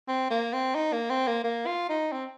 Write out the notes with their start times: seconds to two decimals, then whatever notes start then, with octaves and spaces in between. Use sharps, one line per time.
0.08 C4
0.31 A#3
0.53 C4
0.75 D#4
0.93 A#3
1.10 C4
1.27 A#3
1.44 A#3
1.66 F4
1.89 D#4
2.12 C4